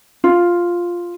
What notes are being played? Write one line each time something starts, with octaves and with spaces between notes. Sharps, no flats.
F4